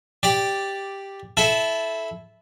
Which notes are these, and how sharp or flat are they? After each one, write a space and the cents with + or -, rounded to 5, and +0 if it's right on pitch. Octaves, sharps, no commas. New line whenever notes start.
G4 +0 D5 +0
E4 +0 A4 -15